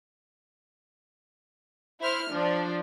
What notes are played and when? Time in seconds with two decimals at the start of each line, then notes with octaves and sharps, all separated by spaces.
2.01 E4 C5 F6
2.32 F3 D4